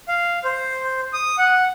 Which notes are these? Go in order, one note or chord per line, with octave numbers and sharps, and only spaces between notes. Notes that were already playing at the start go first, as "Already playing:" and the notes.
F5
C5
D#6
F#5